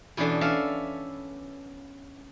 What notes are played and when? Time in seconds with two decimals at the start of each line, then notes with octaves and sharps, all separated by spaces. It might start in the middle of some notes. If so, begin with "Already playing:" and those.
0.17 B2 E3 B3 C#4 D4 A4
0.41 C#4 A4 D5 E5 F5